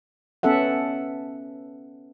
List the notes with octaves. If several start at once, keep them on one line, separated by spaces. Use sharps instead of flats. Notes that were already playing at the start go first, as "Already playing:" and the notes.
B3 C#4 A4 E5 F#5